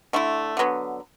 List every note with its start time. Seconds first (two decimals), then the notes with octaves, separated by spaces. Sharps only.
0.13 D3 A3 E4
0.57 D3 F#3 B3